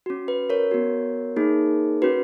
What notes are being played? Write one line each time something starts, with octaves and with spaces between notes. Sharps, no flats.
C#4 F#4
B4
A#4 C#5
B3 F#4
A#3 D#4 G#4
C#4 F#4 B4